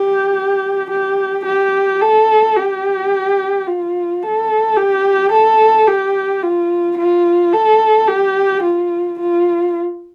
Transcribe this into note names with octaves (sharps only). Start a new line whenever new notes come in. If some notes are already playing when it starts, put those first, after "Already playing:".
Already playing: G4
G4
G4
A4
G4
F4
A4
G4
A4
G4
F4
F4
A4
G4
F4
F4